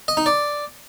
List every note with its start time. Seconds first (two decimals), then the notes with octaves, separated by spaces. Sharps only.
0.08 D#5
0.17 D#4
0.26 D5